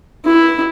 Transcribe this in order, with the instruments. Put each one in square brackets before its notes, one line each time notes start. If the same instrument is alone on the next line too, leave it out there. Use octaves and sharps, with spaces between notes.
[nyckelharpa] E4